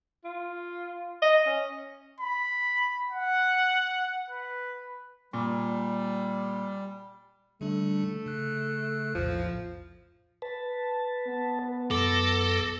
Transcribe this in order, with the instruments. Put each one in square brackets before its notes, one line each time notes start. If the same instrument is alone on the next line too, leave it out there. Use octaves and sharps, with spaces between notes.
[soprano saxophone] F4
D#5
C#4
[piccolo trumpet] B5
F#5
B4
[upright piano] A#2 [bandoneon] G3
[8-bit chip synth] D3 G3 D4 [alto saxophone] A3
[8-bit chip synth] C#3 F#6
[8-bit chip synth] A#1 E2 A2 [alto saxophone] F3
[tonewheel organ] B4 A5
[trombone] B3
[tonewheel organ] F#2 D6 A#6 [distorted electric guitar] A4